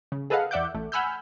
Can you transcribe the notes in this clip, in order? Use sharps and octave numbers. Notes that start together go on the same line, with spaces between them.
C#3
G#4 A4 B4 D#5 F5 F#5
E2 D5 E5 F#5 D6 G6
A1 A3
F#5 G#5 B5 E6 F6 G6